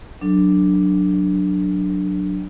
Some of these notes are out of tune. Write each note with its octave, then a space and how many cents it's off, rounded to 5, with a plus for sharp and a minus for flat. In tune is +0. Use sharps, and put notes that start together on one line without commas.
F#3 +0 D4 +0 A4 +0